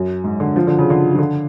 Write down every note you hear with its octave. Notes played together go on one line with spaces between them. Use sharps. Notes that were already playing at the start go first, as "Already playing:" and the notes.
Already playing: F#2
G#2
D3
F3
D3
C#3
D3
F3
D3